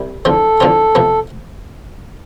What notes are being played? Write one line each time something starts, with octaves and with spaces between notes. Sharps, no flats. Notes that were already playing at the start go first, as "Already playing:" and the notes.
Already playing: C2 C3 G3
E2 D3 F3 C4 F4 A4
E2 D3 F3 C4 F4
C3 F3 B3